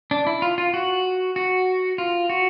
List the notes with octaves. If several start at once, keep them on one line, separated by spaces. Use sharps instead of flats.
D4
E4
F4
F4
F#4
F#4
F4
F#4